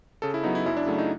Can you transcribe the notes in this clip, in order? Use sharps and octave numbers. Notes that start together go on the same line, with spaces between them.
C#3 A4
E4
F#3 B3 D#4
E4
F#2 E4
D4
C#3 F#3 A3
D#4